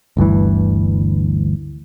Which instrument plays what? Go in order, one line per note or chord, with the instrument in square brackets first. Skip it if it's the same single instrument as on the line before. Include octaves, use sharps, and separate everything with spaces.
[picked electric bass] G1 D2 G2 E3